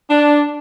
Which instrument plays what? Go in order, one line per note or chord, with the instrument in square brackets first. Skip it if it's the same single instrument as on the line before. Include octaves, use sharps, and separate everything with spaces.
[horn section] D4